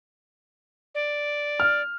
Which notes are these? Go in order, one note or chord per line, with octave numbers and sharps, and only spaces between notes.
D5
F6